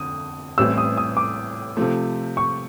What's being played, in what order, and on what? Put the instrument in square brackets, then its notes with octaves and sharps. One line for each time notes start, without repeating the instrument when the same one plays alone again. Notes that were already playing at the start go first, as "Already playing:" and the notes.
Already playing: [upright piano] F2 D3 [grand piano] D#6
[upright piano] A1 A2 E3 G3 C4 [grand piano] E6
[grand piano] D#6
D#6
D6
[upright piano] C3 F3 A3
[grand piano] C#6